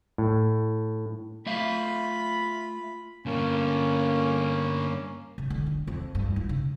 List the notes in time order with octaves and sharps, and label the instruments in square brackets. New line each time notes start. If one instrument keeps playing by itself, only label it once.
[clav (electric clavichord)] A2
[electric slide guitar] A3 E5 F5 [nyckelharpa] F4 B5
[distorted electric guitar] G2 D3 [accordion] A#3 C#4
[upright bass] C#3
D3
D#4
F2
G2
D#4
C#3